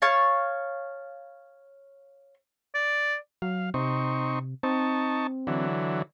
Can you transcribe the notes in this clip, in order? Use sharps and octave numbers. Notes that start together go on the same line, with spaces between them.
C#5 F5 A5
D5
F#3 F5
C3 C4 D#4 C#6
C4 D#4 A5 C#6
D3 E3 F#3